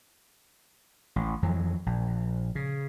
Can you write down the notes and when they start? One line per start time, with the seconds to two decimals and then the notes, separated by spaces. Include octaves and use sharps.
1.16 A1
1.42 F2 E3 F#3
1.86 A#1
2.55 C#3